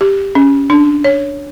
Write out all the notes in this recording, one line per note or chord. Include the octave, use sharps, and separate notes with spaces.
G4
C#4
D4
C#5